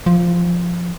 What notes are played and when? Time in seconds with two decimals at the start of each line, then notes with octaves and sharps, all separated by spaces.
0.06 F3